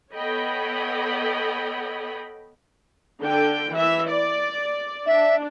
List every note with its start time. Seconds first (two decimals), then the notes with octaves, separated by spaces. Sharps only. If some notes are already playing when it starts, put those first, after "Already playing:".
0.15 B3 A4 C#5 D#5 G5 B5
3.21 D3 G5
3.74 E3 E5
4.10 D5
5.07 D4 E5